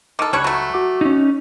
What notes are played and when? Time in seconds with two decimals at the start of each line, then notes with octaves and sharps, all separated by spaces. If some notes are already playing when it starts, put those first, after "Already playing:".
0.19 D#3 A4 D6 F6
0.33 C#2 G3 D4 C#5 B5 F#6
0.44 F#3 A3
0.74 F#4 D6
1.01 C#4 D#4